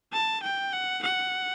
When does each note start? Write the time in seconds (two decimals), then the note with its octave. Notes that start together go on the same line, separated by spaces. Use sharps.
0.13 A5
0.43 G5
0.73 F#5
1.03 F#5